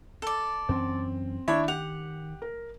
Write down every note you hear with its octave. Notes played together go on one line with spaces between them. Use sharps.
A4 D5
F#2 E3 C4 C#4
D#3 D4 E4 C#5 E5
G4 F#5 F7
A#4